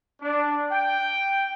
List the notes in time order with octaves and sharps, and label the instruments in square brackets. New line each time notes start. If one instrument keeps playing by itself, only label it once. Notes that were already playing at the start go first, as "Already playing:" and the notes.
[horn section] D4
G5